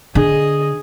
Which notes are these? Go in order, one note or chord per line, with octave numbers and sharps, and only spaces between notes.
D3 G#4 D#5